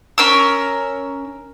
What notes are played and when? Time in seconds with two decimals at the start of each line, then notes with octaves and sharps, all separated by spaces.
0.18 C#4 A#4 E6